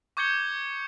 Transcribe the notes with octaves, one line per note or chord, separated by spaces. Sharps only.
C#6 D6 G6 G#6 C#7 G7